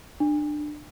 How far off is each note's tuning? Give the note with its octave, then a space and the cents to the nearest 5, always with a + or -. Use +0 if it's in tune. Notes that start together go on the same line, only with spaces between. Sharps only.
D4 +25